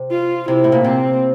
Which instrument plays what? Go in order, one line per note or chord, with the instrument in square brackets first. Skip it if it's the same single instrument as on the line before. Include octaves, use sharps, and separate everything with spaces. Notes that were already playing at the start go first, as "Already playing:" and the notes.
Already playing: [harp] C3
[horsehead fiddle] F4
[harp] C3 [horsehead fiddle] E4
[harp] A2
A#2
[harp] C3 [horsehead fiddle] C4